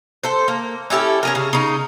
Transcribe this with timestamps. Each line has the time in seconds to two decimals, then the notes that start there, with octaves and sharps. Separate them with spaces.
0.23 A4 C5
0.48 A#3
0.90 C#4 E4 G4 A4
1.23 C#4 G#4 A#4
1.35 C#3
1.53 C#3 D#4